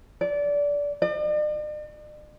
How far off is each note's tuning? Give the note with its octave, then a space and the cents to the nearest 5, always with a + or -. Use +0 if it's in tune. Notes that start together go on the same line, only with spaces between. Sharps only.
D5 -20
D5 +45